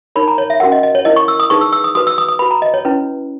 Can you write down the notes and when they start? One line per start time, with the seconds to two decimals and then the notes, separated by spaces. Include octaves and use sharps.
0.16 D#4 A#4 C#5 B5
0.28 A#5
0.38 C#5
0.50 E5
0.60 C#4 F#4 A#4 F#5
0.72 D#5
0.83 D#5
0.95 C#5
1.05 E4 A#4 C#5 D#5
1.16 C#6
1.28 E6
1.40 D#6
1.50 D#4 G#4 B4 C#6
1.61 E6
1.73 E6
1.84 D#6
1.95 F#4 B4 D#6
2.07 E6
2.18 D#6
2.29 D#6
2.39 F#4 B4 B5
2.51 A#5
2.62 D#5
2.74 C#5
2.85 C#4 E4 B4